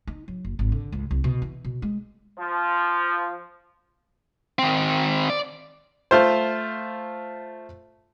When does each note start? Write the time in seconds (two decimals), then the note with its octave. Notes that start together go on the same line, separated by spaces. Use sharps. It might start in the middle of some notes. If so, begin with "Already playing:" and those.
0.07 D#4
0.28 F#3
0.44 F#1
0.59 G#1
0.72 D3
0.92 C#2
1.11 C2
1.24 B2
1.42 E3
1.65 B2
1.82 G#3
2.39 F3
4.59 D#3 C4
5.30 D5
6.11 A3 F4 C5